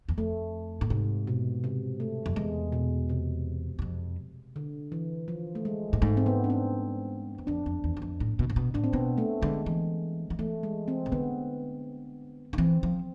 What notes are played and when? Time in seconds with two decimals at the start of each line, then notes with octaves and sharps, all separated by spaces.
0.09 E2
0.18 F2 A3
0.81 A2
0.90 G#2 C3
1.27 B2
1.64 C3
2.00 A3
2.26 F2
2.36 E2 G#3
2.72 B2
3.09 C3
3.79 E2
3.82 F2
4.56 D3
4.92 E3
5.28 F3
5.55 A3
5.65 G#3
5.93 A2
6.02 G#2 A3
6.17 C4
6.26 B3
6.44 D4
6.50 C4
7.38 E2
7.47 F2 D4
7.66 F2
7.84 E2
7.97 E2
8.02 F2
8.20 A2
8.39 B2
8.50 A2
8.56 B2
8.74 A2 D4
8.84 C4
8.93 B2 B3
9.18 A3
9.42 D3 G#3
9.66 E3
10.30 F3
10.39 E3 A3
10.63 G#3
10.88 C4
11.06 C3
11.12 D3 B3
12.53 D3
12.58 E3 C4
12.83 F3